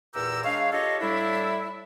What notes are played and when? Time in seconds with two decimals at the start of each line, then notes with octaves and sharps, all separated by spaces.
0.15 E2 A#2 G4 A#4 E6
0.44 G#3 D4 C#5 F5
0.73 F4 G4 A4 C#5 D#5
1.00 A2 G3 D4 E4